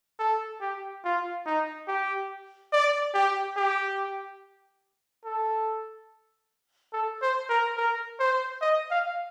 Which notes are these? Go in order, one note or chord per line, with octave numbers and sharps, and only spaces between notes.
A4
G4
F4
D#4
G4
D5
G4
G4
A4
A4
C5
A#4
A#4
C5
D#5
F5